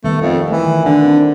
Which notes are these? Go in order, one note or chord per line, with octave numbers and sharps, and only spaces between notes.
D#3 G3 A3 B3
F2
E3 A3
D#3
D3 D#3 D4
C4